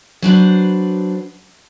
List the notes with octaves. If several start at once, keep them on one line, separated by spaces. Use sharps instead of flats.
F#3 D4 B4 C5